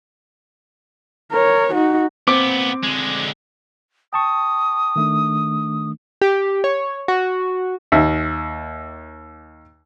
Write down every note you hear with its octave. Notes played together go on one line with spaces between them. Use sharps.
A#4 C#5
D#4 F#4
A#2 B3 C4 D6 D7
D3 G#3
G5 A5 C#6 D#6
D#3 A3 D4
G4
C#5
F#4
D#2 E5